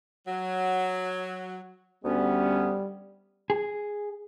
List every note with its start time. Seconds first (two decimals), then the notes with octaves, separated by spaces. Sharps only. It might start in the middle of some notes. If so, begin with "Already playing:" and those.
0.27 F#3
2.05 D2 G3 B3 C#4
3.50 G#4